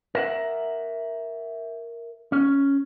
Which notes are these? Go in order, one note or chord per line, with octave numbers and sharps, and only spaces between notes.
A#4 E5 F#5
C#4